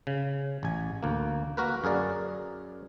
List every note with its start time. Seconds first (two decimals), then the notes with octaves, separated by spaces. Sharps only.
0.07 C#3
0.63 A1 G#5
1.03 D2 A#3
1.57 A#3 F#4 A#4 B4
1.84 F#2 G#4 A#4 D5